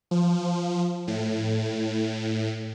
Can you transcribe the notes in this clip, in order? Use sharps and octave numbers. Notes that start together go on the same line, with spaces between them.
F3
A2